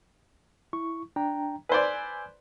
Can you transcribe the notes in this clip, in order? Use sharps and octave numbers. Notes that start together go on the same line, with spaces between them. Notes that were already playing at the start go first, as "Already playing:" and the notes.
E4 C#6
D4 G5 A#5
B4 C5 D5 G#5 E6 G#6